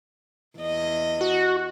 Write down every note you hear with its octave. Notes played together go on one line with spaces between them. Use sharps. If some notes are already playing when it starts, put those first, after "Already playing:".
E2 D#5
F#4